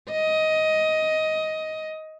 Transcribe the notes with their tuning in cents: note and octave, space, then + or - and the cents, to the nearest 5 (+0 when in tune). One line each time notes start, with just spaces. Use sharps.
D#5 +15